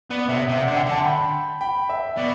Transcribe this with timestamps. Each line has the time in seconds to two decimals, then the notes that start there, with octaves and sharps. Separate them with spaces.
0.11 B3 D5
0.29 C3 E5
0.48 C3 E5
0.62 D3 D5 F#5
0.76 E5 G5
0.86 D3
0.91 F#5 A5
1.00 C6
1.04 G5 B5
1.61 G5 B5
1.89 E5
2.17 B2 D5